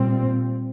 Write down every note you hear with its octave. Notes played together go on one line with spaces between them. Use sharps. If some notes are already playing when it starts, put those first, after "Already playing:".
Already playing: A#2 G3 C4